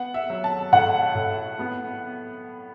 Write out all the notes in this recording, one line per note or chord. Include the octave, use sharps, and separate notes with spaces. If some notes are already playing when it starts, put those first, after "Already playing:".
Already playing: B3 F#5
E5
F#3
A5
A2 F#5
A2
B3